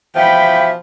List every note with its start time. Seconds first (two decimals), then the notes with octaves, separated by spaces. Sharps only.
0.16 B2 E3 F3 E5 G5 B5